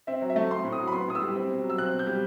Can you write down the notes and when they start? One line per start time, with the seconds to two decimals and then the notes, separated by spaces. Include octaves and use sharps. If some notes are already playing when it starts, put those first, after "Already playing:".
0.07 C4 E5
0.22 F#3
0.30 E5
0.36 A3
0.50 C4 C6
0.64 A2
0.72 D#6
0.79 F#3
0.88 B5
0.93 B3 C6
1.08 A2 D#6
1.15 E6
1.22 G3
1.36 C4
1.50 B2
1.64 F#3
1.70 E6
1.78 C4 F#6
1.93 B2
1.99 G6
2.07 G3